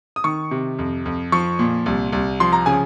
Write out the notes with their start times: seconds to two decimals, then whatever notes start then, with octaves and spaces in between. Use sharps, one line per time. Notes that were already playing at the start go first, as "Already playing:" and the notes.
0.16 D#6
0.24 D#3 C#6
0.51 C3
0.78 F2
1.05 F2
1.32 F3 C#6
1.59 A#2
1.86 C2
2.13 C2
2.40 F3 C6
2.53 A#5
2.66 C#3 G#5